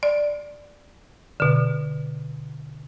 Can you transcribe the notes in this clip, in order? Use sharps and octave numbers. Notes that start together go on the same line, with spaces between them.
D5
B2 D3